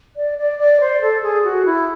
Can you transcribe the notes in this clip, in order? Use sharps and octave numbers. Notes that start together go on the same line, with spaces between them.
D5
D5
D5
C5
A4
G#4
F#4
E4